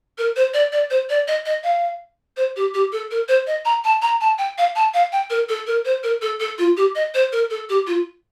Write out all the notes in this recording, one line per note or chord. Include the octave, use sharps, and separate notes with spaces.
A#4
C5
D5
D5
C5
D5
D#5
D#5
F5
C5
G4
G4
A4
A#4
C5
D#5
A#5
A5
A#5
A5
G5
F5
A5
F5
G5
A#4
A4
A#4
C5
A#4
A4
A4
F4
G4
D#5
C5
A#4
A4
G4
F4